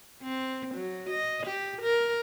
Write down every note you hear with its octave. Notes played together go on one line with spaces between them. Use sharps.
C4
F#3
D#5
G4
A#4